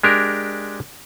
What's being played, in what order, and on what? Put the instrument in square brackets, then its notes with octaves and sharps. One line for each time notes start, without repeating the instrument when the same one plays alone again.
[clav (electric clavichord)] G#3 D4 G4 A#4